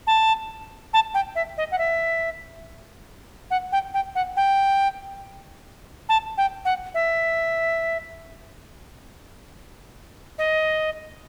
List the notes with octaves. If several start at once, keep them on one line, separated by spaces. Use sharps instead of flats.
A5
A5
G5
E5
D#5
F#5
E5
F#5
G5
G5
F#5
G5
A5
G5
F#5
E5
D#5